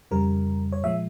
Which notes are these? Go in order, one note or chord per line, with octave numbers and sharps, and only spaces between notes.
F2 C#3 G3 A#4
C#5
A#2 F3 G#3 E5